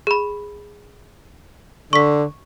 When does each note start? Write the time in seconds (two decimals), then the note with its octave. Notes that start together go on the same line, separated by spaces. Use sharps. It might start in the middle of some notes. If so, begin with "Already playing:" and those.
0.07 G#4 B5
1.93 D3 C#6 B6